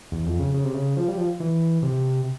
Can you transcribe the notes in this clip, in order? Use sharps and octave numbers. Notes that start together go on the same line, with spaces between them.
E2
F2
C#3
C#3
C3
C#3
F3
G3
F3
E3
C3